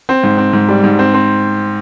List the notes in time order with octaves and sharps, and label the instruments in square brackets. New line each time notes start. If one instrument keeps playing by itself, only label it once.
[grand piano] C4
G#2
C4
G#2
G3
G#2
C4
C4